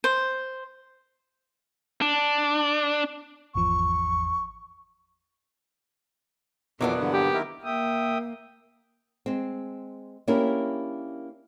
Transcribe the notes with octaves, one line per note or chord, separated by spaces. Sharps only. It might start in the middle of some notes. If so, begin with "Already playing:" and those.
C5
D4
G#1 E2 F3 C#6
F2 B2 E3 F#3 A#3 B3 D4 D6
G2 D3
G4
D#3 E4 A#4
A#3 E5 G5 D#6
G#3 C4
A#3 C#4 D4 E4 G4 A#4